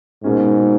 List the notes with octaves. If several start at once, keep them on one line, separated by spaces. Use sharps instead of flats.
G#2 B2 A#3 C#4